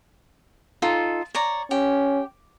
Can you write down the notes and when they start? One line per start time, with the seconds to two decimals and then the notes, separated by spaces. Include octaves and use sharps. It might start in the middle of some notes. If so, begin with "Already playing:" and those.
0.82 D#4 F4 A4
1.35 C#5 D5 A#5
1.71 C#4 G4